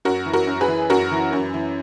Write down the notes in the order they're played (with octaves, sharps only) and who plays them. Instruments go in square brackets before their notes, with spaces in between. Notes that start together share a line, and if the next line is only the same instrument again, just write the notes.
[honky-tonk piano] F#2 F#4 A#4
E3
F#4 A#4
F#2
G#4 B4
E3
F#2 F#4 A#4
E3
F#2
E3